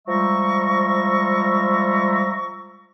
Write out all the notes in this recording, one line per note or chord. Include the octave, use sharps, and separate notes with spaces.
F3 G3 G#3 E5 A#5 C#6